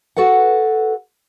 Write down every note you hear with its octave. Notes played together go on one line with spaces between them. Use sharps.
F#4 A4 B4 F#5